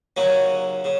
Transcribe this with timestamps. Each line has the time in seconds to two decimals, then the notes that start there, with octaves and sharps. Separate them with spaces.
0.17 D#2 C#3 F#3 C#4
0.84 C#3